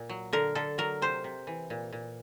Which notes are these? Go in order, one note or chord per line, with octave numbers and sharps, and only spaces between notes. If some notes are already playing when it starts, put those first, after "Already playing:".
Already playing: A#2
F#3
D3 A#4
D3 A4
F#3 A#4
C3 C5
C3
E3
A#2
A#2